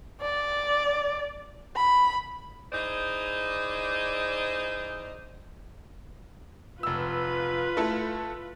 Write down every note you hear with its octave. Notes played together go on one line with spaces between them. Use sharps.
D5
B5
D#4 E4 G#4 C5 D5 D#5
F1 F4 B4 E6
A3 E4 A4